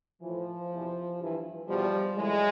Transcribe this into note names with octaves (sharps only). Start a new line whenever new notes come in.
A2 E3 F3
E2 C3 E3
G2 E3
E2 B2 F3 G3
A2 E3 F#3 G#3